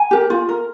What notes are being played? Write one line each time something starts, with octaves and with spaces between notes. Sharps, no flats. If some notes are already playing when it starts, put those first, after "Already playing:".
Already playing: G#5
G4 A#4
F4
A#4